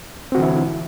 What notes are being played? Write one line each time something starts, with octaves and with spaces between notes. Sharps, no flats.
D3 E3 C4 E4 F#4